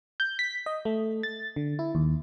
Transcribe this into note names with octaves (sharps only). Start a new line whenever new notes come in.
G6
B6
D#5
A3
A6
D3
E4
D#2